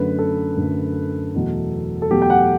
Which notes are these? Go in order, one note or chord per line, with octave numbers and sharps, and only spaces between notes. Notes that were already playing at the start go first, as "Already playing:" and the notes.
Already playing: F#2 D3 A3 B4
A4
F#2 D3 A3
E2 B2 F#3 A3
A4
E2 B2 F#3 A3 G4
G5
F#5